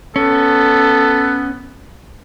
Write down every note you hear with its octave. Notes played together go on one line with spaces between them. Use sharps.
B3 C#4 A4